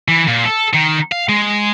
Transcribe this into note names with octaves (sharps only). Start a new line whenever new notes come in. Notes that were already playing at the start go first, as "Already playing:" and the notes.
E3
A#2
A4
D#3
F5
G#3